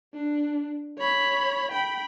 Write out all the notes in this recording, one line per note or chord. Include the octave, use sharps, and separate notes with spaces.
D4
C#5 B5
G5 B5